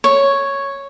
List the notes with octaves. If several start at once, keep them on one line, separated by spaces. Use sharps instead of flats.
C#5